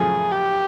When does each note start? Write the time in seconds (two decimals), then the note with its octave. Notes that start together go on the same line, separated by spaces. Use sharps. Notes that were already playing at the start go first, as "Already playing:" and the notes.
Already playing: F#2 C#3 F3 A3 G#4
0.32 G4